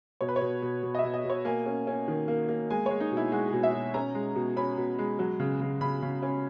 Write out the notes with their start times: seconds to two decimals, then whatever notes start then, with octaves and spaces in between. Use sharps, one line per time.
0.21 B2 C#5
0.28 B4
0.36 C#5
0.41 B2
0.62 B2
0.83 B2
0.95 D#5
0.98 E5
1.04 B2
1.14 D#5
1.25 B2 C#5
1.45 A#3 G#5
1.66 C#4
1.87 C#4
2.08 D#3
2.28 A#3
2.48 A#3
2.70 G#3 G#5
2.86 G#3 C#5
3.00 D#4
3.11 B2
3.17 E4
3.32 G#3 F#4
3.48 G#4
3.53 B2
3.63 E5
3.73 B2
3.94 C#4 A#5
4.15 G#3
4.36 B2
4.57 C#4 B5
4.78 B2
4.99 G#3
5.19 F#3
5.40 C#3
5.61 C#3
5.81 C#3 B5
6.02 C#3
6.23 C#4